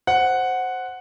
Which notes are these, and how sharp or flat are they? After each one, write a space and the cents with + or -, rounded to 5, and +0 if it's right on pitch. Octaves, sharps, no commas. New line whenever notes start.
C5 +0 F#5 +0